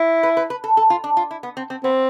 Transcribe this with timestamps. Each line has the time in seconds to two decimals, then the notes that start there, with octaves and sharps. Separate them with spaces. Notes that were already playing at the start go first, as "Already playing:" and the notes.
Already playing: E4
0.23 B4
0.37 B4
0.50 B4
0.64 A4
0.77 A4
0.90 F4
1.04 D4
1.17 F4
1.31 E4
1.43 B3
1.57 C4
1.70 C4
1.84 B3 C4